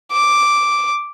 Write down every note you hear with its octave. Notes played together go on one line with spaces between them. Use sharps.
D6